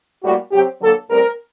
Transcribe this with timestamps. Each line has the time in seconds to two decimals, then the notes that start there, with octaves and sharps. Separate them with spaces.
0.23 A2 G3 A#3 F#4
0.52 C3 F#3 C4 G4
0.81 D3 F#3 A#3 A4
1.09 A2 G3 C4 A#4